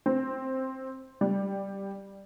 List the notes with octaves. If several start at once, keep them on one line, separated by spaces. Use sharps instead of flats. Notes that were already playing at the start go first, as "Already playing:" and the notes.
C4
G3